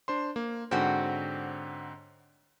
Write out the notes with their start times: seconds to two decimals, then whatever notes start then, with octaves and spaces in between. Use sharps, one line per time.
0.08 D4 C5 C6
0.36 A#3
0.71 G#2 D3 C4 C#4 F#4